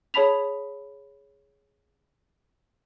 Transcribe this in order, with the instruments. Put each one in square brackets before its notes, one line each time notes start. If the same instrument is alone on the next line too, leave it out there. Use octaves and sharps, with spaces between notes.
[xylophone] G#4 C#5 A5 B5 B6 F7